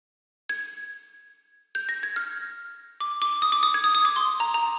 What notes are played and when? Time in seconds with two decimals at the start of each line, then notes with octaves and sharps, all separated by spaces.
0.49 G#6
1.75 G6
1.89 A#6
2.03 G#6
2.16 F6
3.00 D6
3.22 D6
3.42 D#6
3.52 D6
3.63 D#6
3.74 G#6
3.84 D#6
3.95 D#6
4.05 D6
4.16 C6
4.40 A#5
4.54 A#5